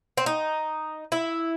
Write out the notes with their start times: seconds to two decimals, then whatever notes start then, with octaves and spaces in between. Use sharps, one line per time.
0.17 C4
0.26 D#4
1.12 E4